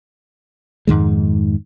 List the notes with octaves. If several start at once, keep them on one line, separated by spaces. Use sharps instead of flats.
F2 G#2 D#3 G#3